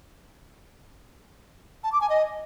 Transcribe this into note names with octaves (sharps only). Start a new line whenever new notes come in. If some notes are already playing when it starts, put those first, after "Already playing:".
A5
D6
G#5
D#5